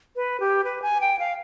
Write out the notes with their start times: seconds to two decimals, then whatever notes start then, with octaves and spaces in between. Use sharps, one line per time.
0.16 B4
0.40 G4
0.64 B4
0.82 G#5
1.01 G5
1.19 F5